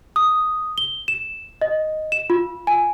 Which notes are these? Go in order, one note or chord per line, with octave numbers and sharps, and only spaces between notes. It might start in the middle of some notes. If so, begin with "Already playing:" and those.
D#6
G7
E7
D#5
E7
F4
G#5